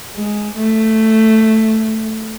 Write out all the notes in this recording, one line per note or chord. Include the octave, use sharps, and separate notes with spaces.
G#3
A3